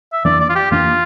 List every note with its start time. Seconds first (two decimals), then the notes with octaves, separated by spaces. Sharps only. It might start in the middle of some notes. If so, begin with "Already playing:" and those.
0.13 E5
0.25 F2 E3 A#3 D4 D5
0.40 D5
0.49 F4
0.55 G4
0.71 F2 E3 A#3 D4 F4